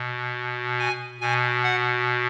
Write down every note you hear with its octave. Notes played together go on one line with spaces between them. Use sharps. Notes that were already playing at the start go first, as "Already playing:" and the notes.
Already playing: B2
G#5
B2 G#5
F#5